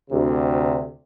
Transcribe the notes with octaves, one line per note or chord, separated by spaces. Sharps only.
D2 C3